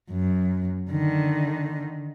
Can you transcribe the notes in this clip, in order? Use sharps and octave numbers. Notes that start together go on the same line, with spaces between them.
F#2
D3 D#3